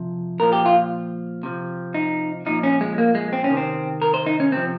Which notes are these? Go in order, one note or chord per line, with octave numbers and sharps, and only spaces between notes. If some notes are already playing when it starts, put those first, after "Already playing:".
Already playing: C3 F3
A#2 F3 A#4
G4
F4
C3 F3
D#4
A#2 F3 D#4
C#4
G#3
A#3
G#3
C4
C#4
C3 D#3
C4
A#4
C5
D#4
C#4
C3 F3 C4